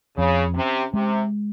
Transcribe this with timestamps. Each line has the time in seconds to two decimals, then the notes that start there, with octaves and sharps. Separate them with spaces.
0.17 F2 C#3
0.55 C3 C#4
0.94 C3 G#3